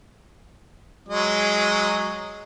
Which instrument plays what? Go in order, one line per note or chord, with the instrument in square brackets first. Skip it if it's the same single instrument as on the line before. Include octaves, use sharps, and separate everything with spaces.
[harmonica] F#3 G#3 D#5